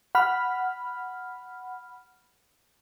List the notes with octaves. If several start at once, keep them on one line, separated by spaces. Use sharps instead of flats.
F#5 B5 F6